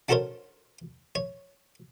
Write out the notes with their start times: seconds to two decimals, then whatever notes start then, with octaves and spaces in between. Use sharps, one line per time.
0.09 D4 F#4 A4 A#4 C5 C#5
1.15 C#5